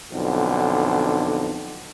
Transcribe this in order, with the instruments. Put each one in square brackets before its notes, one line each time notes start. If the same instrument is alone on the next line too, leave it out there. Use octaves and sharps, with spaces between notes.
[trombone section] B1 F2 D3